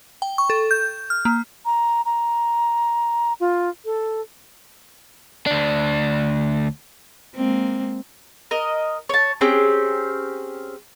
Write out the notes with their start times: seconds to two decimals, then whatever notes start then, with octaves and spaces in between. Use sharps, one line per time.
0.22 G5
0.38 C#6
0.50 A4
0.71 G6
1.10 F6
1.25 A#3
1.65 A#5
2.05 A#5
3.40 F4
3.85 A4
5.46 D2 D4
7.36 G#3 A#3 C4
8.51 A#4 D#5
9.09 C#5 A5
9.41 C4 C#4 G4 G#4